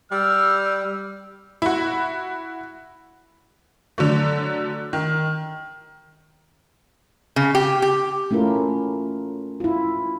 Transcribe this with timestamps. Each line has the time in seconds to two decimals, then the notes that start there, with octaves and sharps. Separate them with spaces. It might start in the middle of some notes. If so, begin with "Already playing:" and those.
0.12 G3 E6 F6
1.62 E4 F#4
3.98 D3 F#3 A3
4.93 D#3
7.36 C#3
7.55 G4
7.82 G4
8.31 A3 C#4 E4 F4 A#4
9.60 E4 F4